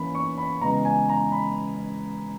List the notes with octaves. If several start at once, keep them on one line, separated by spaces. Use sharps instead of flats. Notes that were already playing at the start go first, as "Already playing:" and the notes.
Already playing: E3 A#3 C#4 B5
C#6
B5
C#3 E3 G#3 B3 A#5
G#5
A#5
B5